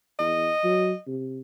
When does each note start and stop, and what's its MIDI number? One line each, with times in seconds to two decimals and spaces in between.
0.19 0.49 40
0.19 1.02 75
0.64 0.92 54
1.07 1.41 48